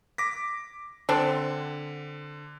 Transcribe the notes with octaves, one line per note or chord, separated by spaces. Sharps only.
D6 A#6 B6
D3 C4 D4